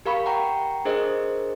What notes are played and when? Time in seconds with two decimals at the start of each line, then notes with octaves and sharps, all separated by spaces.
0.06 G4 A#4 F5 B5 C#6
0.26 F#5 G5 A#5 C#6
0.85 D4 G#4 A#4 C5 D#5